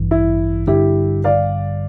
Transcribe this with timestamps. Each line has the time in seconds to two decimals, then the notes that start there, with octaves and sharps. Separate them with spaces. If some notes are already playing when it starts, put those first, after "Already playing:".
Already playing: A1 G2 E3
0.11 E4
0.67 G2 D3 G3 E4 G4
1.24 D5 F5